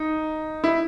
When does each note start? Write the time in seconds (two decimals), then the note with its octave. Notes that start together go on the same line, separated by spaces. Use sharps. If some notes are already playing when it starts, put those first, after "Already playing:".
Already playing: D#4
0.64 E4